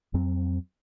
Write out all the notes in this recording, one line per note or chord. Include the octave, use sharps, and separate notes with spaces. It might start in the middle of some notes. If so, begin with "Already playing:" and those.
F2 F#3 C4